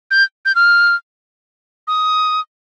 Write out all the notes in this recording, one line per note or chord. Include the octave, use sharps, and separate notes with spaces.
G6
G6
F6
D#6